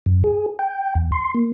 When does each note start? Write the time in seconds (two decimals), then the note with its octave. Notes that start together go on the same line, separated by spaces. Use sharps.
0.06 F#2
0.24 G#4
0.59 G5
0.95 E2
1.12 C6
1.35 A#3